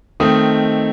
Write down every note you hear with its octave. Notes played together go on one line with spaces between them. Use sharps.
D#3 A3 C4 D#4 D#6